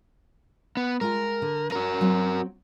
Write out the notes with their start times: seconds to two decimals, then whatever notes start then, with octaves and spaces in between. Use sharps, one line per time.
0.77 B3
1.01 G#3 F4 A#4 G5
1.42 D3
1.72 C#4 F#4 A#4
2.01 F#3 C4